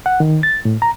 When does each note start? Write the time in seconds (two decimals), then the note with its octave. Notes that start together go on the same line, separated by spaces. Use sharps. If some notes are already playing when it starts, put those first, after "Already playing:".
0.06 F#5
0.20 D#3
0.43 A6
0.65 A2
0.82 A#5